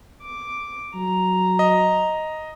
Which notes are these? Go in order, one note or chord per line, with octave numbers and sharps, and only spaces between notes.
D6
F#3 A#5
D#5